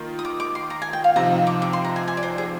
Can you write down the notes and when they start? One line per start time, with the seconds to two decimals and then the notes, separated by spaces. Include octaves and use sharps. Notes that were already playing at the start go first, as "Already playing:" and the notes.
Already playing: D#3 A#3 F4 A#4
0.19 D#6
0.25 D6
0.40 D6
0.55 C6
0.70 A#5
0.82 G#5
0.93 G5
1.04 F5
1.16 C3 F3 C4 D#4 A#5
1.47 D6
1.62 D6
1.73 C6
1.85 A#5
1.96 G#5
2.08 G#5
2.17 D5
2.23 C5
2.38 G#4